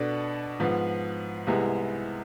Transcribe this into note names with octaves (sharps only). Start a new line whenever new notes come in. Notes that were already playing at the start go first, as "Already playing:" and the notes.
Already playing: B2 B3 D4 A4
G#2 F3 B3
C2 C3 G#3 B3 E4